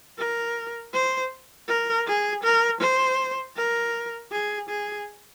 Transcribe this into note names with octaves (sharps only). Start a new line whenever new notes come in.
A#4
C5
A#4
G#4
A#4
C5
A#4
G#4
G#4